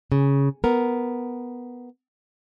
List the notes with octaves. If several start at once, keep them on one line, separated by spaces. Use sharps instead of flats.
C#3
B3 A#4